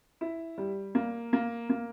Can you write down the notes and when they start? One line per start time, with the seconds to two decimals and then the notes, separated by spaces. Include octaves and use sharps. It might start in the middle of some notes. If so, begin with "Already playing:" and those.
0.21 E4
0.58 G3
0.95 A#3
1.33 A#3
1.70 A#3